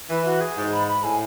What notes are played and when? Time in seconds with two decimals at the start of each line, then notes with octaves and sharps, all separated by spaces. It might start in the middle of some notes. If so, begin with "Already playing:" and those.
0.09 E3 E4
0.25 F#4
0.41 G#4
0.57 G#2
0.72 B5
0.88 B5
1.04 A2 G#5